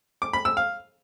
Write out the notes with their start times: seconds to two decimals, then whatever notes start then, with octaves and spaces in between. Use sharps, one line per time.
0.22 D6
0.33 B5
0.45 E6
0.57 F5